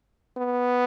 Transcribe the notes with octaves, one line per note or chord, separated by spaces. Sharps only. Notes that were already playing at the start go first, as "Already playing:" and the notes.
B3